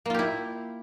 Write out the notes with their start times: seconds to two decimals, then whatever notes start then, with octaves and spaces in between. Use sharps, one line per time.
0.06 A#3
0.10 F4
0.14 G4
0.19 E4